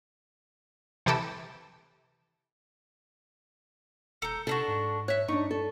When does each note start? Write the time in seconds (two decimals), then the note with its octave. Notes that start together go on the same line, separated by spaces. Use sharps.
1.06 C3 E3 G4 A4
4.22 E1 A4 A#5 G6
4.47 C3 D4 E4 F#4 A4
4.68 G#2
5.08 C#5 E5 F#6
5.28 G2 D4 D#4 C#6
5.51 A4